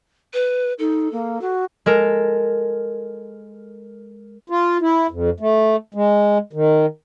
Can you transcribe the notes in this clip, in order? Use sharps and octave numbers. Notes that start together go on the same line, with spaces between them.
B4
D#4 A4
A#3
F#4
G#3 A4 A#4
F4
E4
F2
A3
G#3
D#3